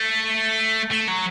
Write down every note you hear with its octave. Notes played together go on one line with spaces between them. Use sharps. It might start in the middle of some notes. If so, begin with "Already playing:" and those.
Already playing: A3
A3
F#3